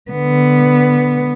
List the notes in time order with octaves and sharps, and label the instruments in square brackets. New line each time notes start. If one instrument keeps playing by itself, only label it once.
[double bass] D3 [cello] B3